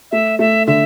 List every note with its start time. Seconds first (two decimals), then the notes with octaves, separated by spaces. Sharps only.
0.11 A3 E5
0.39 A3 E5
0.67 D3 E5